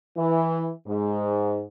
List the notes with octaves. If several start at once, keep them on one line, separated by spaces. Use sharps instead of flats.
E3
G#2